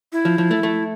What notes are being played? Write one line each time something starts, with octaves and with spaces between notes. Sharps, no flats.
E4
F3
F3
A3
A3